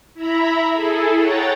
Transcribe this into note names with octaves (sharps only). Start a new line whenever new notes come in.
E4 E5 A#5 B5
E4 G#4 A4
C#5 F#5 G5 A#5 A6